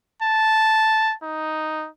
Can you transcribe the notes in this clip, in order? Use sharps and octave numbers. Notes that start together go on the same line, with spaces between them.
A5
D#4